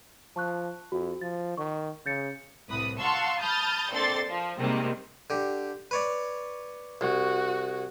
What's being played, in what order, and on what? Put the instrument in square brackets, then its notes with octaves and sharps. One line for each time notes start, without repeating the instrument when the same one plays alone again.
[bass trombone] F3 [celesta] A5 C#6 F#6
[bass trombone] F2 [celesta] F#4
[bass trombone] F3 [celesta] A6
[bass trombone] D#3 [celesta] C#6
[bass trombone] C#3 [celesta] G6 A6 C#7
[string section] C2 A2 B4 D#6
F5 F#5 A5 C6 C#6 E6
A5 B5 D#6 F6 G6 A6
A#1 C4 A4 D5 C6 A6
F3
C3 D#3 G3 G#3 A#3 C4
[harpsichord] D3 G4
B4 C#5 D5
[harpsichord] C2 [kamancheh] F#4